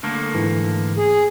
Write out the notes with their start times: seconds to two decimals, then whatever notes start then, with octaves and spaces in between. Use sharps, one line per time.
0.03 D3 A3 A#3
0.35 G#2 E3
0.97 G#4